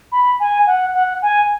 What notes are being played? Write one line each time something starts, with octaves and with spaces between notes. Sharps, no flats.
B5
G#5
F#5
F#5
G#5